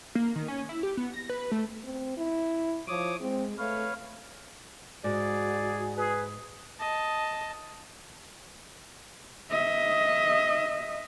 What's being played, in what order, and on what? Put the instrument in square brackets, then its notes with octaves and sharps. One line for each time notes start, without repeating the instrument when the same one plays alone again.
[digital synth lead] A#3
D#3
C#4
E4
G4
B3
A#6
B4
A3
[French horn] C4
E4
[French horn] F3 [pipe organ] C#5 D6 D#6
[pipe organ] G#3 [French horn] C4
[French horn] A3 [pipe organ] B4 C#5 F5
[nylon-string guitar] G#2 [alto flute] F#4 [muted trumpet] G#4 [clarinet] D5
[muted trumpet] G#4 [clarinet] B4
[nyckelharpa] D#5 [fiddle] A5
[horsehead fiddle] D#5 E5